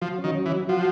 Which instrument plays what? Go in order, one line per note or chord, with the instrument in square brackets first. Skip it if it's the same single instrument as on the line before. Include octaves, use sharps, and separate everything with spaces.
[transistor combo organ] F3 [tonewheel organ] F#3
[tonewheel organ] C#4
[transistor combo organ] D#3
[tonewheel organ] F#3
[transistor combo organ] E3
[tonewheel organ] F#3
[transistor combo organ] F3 [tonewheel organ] F#4